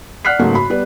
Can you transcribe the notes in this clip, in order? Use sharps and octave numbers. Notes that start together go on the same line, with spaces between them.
D5 F#5 F6 F#6 B6 C7
G#2 C#3 F#3 A3 A#3
F#2 B5
G3 B3 B4 D5